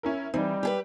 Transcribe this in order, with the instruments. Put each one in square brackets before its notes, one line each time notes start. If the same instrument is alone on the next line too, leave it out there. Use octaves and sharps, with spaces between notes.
[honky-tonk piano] C#4 E4 A#4
[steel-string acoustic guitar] E3 [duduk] G3 [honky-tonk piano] C4 D#4
[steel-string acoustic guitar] G4 G#4 B4